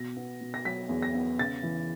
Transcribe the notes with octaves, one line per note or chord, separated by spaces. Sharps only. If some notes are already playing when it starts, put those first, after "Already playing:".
Already playing: B2 A#6
B3
B2
A#6
F#3 B6
E2
A#6
B3
C#3 A6
E3